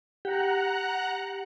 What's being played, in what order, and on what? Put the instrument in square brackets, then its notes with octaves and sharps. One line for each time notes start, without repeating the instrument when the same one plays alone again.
[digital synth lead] G4 [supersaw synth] F#5 A#5 F#6